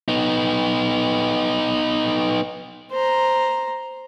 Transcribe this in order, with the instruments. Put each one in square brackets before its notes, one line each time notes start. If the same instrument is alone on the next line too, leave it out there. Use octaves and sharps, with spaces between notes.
[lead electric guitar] B3 D#4
[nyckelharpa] C5 A#5